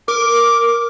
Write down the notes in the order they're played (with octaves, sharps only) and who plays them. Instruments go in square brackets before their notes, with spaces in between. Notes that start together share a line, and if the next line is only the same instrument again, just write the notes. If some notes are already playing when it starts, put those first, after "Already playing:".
[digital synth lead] A#4 [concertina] D6